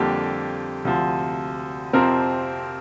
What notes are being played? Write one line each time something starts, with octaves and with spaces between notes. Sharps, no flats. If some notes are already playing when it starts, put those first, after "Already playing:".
Already playing: F2 D3 G3 A#3 G4
D2 C3 F3
F2 C3 F3 C4 A#4